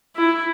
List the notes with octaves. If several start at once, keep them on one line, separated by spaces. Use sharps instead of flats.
E4